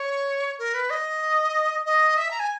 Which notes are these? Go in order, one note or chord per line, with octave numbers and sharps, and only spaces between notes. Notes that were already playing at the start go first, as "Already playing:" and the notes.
Already playing: C#5
A#4
B4
D#5
D#5
E5
A#5
G#5